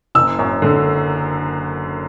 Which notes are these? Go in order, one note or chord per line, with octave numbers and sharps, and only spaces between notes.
F#1 E6
F#2
D3